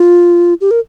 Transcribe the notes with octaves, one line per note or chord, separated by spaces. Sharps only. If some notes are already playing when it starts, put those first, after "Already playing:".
Already playing: F4
G4
A#4